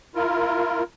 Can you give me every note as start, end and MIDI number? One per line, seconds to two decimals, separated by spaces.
0.15 0.83 64
0.15 0.83 65
0.15 0.83 70